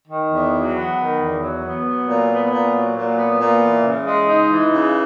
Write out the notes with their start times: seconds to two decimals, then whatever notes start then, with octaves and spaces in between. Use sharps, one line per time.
0.08 D#3
0.30 E2
0.52 F#3
0.74 B3
0.97 D#3
1.18 E2
1.40 F#3
1.63 B3
1.84 F#3
2.06 A#2
2.29 B3
2.51 A#2
2.73 F#3
2.95 A#2
3.17 B3
3.40 A#2
3.61 E3
3.83 C#3
4.06 G#3
4.28 D#4
4.49 E3
4.72 C#3